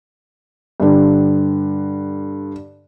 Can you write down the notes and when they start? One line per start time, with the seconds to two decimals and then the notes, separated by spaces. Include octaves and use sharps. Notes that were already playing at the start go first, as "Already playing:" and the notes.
0.80 G2 D3